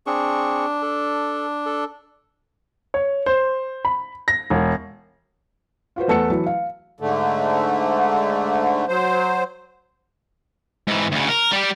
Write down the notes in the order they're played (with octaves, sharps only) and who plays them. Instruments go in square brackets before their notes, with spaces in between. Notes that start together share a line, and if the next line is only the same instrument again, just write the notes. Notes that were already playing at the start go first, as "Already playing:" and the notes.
[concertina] C4 G#4 C#6 [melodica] D4
[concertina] A4
A4
[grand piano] C#5
C5
B5
A#6
E1
[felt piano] F4 F#4 B4 C5
E2 A3 A4 B4 F#5 C#7
E3 F#3 E4
F5
[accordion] G#2 D3 A3
F#3 C5
[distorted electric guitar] G#2 E3
D2 C#3
A#4
G3 G4